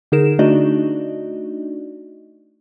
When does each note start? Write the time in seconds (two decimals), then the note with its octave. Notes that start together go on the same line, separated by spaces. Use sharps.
0.12 D3 D#4 G#4 A#4 E7
0.39 A3 D4 D#4 F#4 D5 D#5